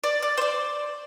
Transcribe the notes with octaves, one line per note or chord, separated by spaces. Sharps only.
D5
D5
C5
D5